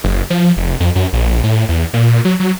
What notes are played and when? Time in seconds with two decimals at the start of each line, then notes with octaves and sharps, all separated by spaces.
0.04 F#1
0.30 F3
0.57 F1
0.80 F2
0.95 F#2
1.13 A#1
1.44 A2
1.69 E2
1.94 A#2
2.25 F#3
2.40 F#3